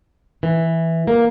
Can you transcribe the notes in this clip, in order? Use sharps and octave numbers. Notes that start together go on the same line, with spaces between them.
E3
A#3